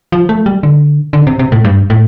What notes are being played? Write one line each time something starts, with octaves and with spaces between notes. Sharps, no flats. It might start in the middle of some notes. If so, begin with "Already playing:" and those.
F3
A3
G3
D3
D3
C3
C3
A2
G2
A2